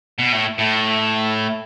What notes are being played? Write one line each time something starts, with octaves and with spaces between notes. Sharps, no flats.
B2
A2
A2